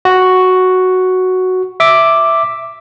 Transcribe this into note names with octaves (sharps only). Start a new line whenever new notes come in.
F#4
E5 D6